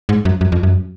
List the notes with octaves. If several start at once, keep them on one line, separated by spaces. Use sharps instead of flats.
G#2
F#2
F#2
F2
F#2